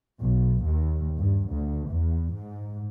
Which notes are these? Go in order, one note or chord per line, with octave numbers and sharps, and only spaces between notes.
B1
D#2
G2
D2
E2
G#2